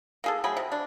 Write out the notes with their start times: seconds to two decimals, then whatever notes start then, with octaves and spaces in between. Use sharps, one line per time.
0.24 A#3 G#4 A4
0.44 F#3 A3 G#4 B5
0.57 C3
0.72 D4